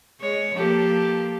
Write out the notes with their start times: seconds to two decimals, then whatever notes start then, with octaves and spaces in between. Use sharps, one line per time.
0.21 G#3 C#5
0.56 F3 A#3 G4 A4